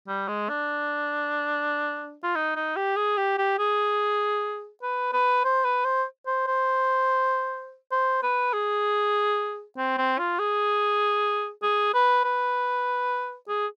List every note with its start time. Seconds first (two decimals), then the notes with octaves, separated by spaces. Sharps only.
0.08 G3
0.28 G#3
0.49 D4
2.23 F4
2.35 D#4
2.56 D#4
2.76 G4
2.96 G#4
3.18 G4
3.38 G4
3.59 G#4
4.82 B4
5.13 B4
5.44 C5
5.65 B4
5.85 C5
6.27 C5
6.47 C5
7.92 C5
8.23 B4
8.53 G#4
9.77 C4
9.98 C4
10.19 F4
10.39 G#4
11.63 G#4
11.94 B4
12.24 B4
13.48 G#4